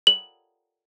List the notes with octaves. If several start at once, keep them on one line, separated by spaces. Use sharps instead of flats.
F#7